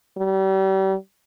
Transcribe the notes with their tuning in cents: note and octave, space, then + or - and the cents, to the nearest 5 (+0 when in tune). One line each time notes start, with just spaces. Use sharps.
G3 -35